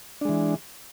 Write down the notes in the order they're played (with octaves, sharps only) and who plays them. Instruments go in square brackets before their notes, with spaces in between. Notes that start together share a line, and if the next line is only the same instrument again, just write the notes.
[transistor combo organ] D4
G#3
E3